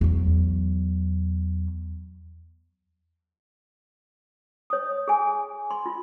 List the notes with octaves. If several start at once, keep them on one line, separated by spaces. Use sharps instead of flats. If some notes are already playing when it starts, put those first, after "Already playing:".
E2 F#3
C#5 D#6
G#4 G#5
C6
F4